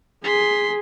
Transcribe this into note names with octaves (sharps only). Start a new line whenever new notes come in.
G#4 C6 B6